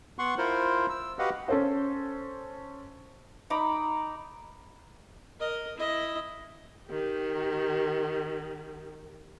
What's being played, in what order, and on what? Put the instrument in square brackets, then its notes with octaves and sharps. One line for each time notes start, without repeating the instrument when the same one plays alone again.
[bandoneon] B3 F#5 C6 C#6
E4 F4 A#4 C5
E6
F#4 G4 B4 D#5 F5 F#5
[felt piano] C#4 A4 C5
[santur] D#4 A#5 B5 D6
[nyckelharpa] A#4 D#5
E4 D#5
[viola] D#3 G4